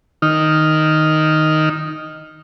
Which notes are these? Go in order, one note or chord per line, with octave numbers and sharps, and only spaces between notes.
D#3 D#4 F6